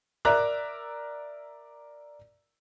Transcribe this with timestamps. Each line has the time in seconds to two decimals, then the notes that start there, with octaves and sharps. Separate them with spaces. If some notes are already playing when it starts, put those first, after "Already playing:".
0.25 A#4 D5 E5 A#5 D6 F#6